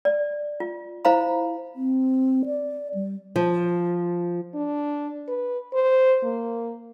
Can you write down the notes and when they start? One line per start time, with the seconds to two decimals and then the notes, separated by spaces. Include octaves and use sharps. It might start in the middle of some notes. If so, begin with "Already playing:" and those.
0.05 D5
0.60 F4
1.05 E4 C5 F5 A#5 B5
1.76 C4
2.46 D5
2.94 G3
3.36 F3
4.55 D4
5.28 B4
5.74 C5
6.23 A#3